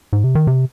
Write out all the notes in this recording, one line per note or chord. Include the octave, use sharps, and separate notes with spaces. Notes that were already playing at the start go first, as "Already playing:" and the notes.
G#2
C3
D#3
C3